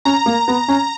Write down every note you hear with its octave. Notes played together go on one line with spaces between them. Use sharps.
C#4 A#5
A#3
B3
C#4